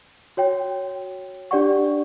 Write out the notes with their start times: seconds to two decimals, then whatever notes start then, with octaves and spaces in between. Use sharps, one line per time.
0.37 F#4 C#5 G5
1.51 D4 G4 D5 F#5 C#6